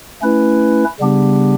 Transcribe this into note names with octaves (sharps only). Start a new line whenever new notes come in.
A3 C#4 E4 B4
C#3 G3 B3 D4 G4